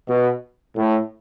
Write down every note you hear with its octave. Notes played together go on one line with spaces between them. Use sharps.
B2
A2